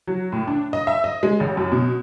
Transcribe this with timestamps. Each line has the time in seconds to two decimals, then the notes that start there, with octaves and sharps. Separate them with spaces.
0.07 F#3
0.32 A2
0.47 D4
0.73 D#5
0.87 E5
1.04 D#5
1.23 G#3
1.40 A1
1.57 F#2
1.72 B2